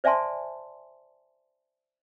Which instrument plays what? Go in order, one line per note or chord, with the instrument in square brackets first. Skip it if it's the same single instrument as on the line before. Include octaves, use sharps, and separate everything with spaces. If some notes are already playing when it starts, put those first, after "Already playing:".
[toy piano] C5 D5 E5 G#5 A5 C6